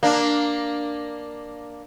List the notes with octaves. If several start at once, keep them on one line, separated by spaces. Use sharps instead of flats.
A#3 D4